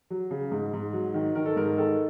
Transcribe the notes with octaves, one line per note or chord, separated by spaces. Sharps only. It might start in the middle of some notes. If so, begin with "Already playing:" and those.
F#3
C#3
G#2
G#2
F#3
D#3
D#3 A#4
A4
G#2 A#4
D#3 A4